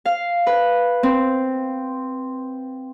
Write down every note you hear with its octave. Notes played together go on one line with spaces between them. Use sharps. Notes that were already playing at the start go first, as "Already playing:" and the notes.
F5
B4
C4